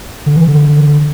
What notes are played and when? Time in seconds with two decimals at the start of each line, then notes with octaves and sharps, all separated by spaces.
0.26 D3
0.36 E3
0.47 D3